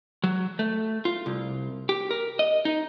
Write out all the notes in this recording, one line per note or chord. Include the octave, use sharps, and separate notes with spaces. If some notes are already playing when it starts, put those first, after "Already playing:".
F#3
A3
F4
C2
G4
A#4
D#5
D#4